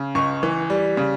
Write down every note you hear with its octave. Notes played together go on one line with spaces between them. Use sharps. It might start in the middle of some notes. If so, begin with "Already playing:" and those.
Already playing: C#3
C#2 C#6
E3
G3
C#3